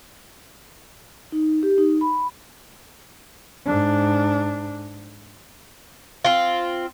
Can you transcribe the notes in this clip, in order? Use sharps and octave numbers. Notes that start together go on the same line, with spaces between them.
D#4
G4
D#4
B5
G#2 D4
C4 F4